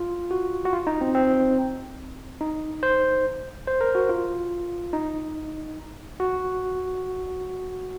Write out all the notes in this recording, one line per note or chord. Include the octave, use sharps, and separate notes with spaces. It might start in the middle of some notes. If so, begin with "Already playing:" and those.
Already playing: F4
F#4
F#4
F4
D#4
C4
C4
D#4
C5
C5
A#4
F#4
F4
D#4
F#4